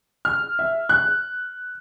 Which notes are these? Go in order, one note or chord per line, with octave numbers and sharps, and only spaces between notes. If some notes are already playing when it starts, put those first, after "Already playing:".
F6
E5
F#6